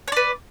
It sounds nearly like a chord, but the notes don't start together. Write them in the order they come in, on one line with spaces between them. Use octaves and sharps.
C#5 D5 B4